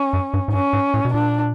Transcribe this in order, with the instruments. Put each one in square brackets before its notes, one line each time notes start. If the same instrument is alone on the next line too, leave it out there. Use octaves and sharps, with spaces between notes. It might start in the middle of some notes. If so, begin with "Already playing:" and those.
Already playing: [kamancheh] C#4
[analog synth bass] F#2
G2
G#2
[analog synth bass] G2 [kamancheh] C#4
[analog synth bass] G#2
A2
B2
[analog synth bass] A#2 [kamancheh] D4